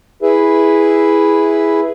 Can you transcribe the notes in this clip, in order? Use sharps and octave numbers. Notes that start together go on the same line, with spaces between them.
E4 G#4 B4 E5